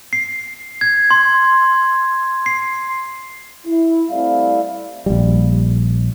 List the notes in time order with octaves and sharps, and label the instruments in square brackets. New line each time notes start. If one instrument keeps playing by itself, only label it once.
[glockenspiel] C7
G#6
C6
C7
[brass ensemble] E4
G3 A3 C4 E4 D5 F5
[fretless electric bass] A#1 G3